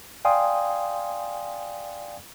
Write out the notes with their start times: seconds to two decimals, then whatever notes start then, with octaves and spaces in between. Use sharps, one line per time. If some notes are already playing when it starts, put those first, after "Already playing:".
0.25 D5 F5 G5 G#5 C6 D#6